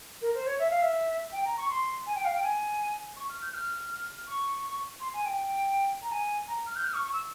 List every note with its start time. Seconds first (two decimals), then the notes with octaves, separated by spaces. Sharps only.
0.22 A#4
0.35 C5
0.46 C#5
0.59 E5
0.70 F5
0.82 E5
1.33 G5
1.45 A#5
1.58 C#6
1.70 C6
2.06 G#5
2.15 G5
2.25 F5
2.34 G5
2.43 G#5
3.17 C#6
3.29 F6
3.42 G6
3.54 F6
3.91 F6
4.27 C#6
5.01 C6
5.14 G#5
5.26 G5
6.02 A#5
6.12 G#5
6.48 A#5
6.67 F6
6.76 G6
6.85 F6
6.94 C#6
7.04 C#6
7.13 E6